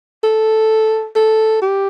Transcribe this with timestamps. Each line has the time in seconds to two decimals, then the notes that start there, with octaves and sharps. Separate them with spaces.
0.24 A4
1.16 A4
1.62 G4